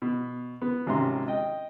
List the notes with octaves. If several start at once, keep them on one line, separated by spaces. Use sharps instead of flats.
B2
B3
G#1 G#2 C3 C#4 A#5 C6
D#5 G5